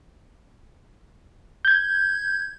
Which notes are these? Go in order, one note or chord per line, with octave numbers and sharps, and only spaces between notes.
G6 G#6